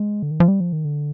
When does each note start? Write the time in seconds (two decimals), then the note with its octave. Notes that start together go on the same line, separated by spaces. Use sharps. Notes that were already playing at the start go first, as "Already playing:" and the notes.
Already playing: G#3
0.23 D3
0.31 D#3
0.40 F3
0.48 G3
0.60 F3
0.73 D#3
0.85 D3